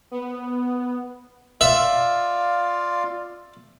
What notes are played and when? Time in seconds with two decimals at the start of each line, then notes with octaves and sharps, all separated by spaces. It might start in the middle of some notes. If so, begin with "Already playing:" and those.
0.11 B3
1.61 F4 D5 E5 F5